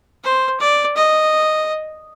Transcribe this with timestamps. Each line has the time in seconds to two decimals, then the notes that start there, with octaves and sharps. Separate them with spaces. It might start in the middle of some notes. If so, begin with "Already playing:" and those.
0.24 C5
0.60 D5
0.96 D#5